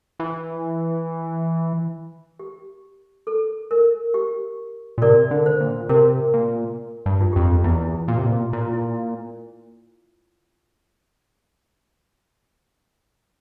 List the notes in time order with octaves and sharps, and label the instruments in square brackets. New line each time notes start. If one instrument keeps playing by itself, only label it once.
[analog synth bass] E3
[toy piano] G4
A4
A#4
G4
[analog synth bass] A#2
[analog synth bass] C3 [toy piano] A#4 D5
[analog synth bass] D3
[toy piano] C5
[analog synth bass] A#2
[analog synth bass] C3 [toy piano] A#4
[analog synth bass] A#2
G2
[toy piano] F4
[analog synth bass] F2 [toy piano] G4
[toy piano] F4
[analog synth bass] E2 [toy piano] E4
[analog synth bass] A#2
C3
A#2
[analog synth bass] A#2 [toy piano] E4
[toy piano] F4
E4